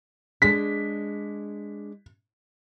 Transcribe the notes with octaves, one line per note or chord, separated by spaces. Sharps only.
G#3 D4 B6